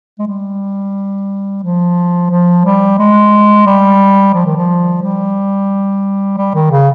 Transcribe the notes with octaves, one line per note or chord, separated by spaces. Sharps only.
G#3
G3
F3
F3
G3
G#3
G3
F3
D#3
F3
G3
G3
D#3
C#3